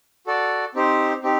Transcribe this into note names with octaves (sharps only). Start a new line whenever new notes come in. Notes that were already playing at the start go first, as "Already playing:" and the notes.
F#4 A4 D5
C4 D#4 G4 C5
C4 D#4 G4